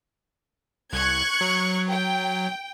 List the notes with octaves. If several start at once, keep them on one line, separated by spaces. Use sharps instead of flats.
C2 C#6 F#6 G#6
F#3
G5